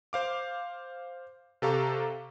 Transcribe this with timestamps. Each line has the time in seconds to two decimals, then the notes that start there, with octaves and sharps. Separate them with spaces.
0.13 C5 F5 D6
1.62 C3 G4 A4 F5 A#5 C#6